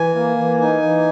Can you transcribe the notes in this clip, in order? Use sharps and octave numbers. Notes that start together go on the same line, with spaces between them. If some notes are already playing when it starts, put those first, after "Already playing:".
Already playing: E3 G#5
A#3
E3
D#4 G#5
E3